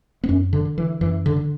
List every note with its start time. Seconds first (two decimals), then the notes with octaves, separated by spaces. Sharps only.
0.24 B3
0.28 F#2 C#4
0.53 D3
0.65 D3
0.78 E3
1.01 F#2 E3
1.26 D3
1.37 D3